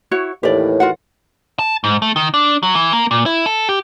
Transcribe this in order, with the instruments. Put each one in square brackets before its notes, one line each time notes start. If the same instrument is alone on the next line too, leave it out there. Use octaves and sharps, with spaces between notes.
[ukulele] E4 F#4 C#5
[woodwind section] D#2 A2 E3 [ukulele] G4 D5
[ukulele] F4 F#4 F#5
[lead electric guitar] A5
G#2
A3
D#3
D4
F#3
E3
A#3
A#2
E4
A4
G4